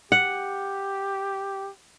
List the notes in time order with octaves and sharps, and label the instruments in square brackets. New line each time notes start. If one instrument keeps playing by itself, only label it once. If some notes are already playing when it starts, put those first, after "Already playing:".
[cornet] G4 [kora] F#5